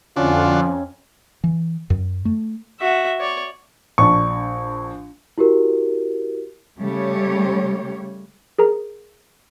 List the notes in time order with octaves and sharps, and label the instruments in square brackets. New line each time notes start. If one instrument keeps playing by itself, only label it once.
[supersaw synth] F2 [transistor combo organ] D3 D4 F#4 [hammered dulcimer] C#4 [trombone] F4
[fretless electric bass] E3
F#2
A3
[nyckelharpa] F#4 E5
C#5 D5
[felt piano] A#1 D4 A5 [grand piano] C#6
[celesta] E4 F#4 G4 A#4
[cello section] C#3 G3 A3 G4 C#5
[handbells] G#4 A#4 A#5